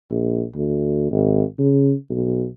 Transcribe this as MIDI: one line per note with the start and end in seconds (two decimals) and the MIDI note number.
0.11 0.44 34
0.55 1.08 38
1.11 1.43 32
1.58 1.94 49
2.10 2.46 35